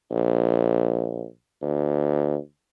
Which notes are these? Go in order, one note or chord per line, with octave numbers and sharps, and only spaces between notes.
A#1
D2